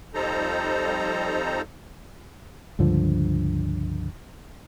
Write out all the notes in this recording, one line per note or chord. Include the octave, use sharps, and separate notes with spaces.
F2 G3 D#4 A4 C5 A#5
C#2 G2 D3 F3